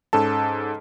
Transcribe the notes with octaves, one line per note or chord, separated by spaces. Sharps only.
G#2 C#4 A4 A5